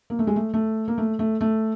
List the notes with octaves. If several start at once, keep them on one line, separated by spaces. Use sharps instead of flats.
A#3
A3
G#3
A3
A3
A#3
A3
A3
A3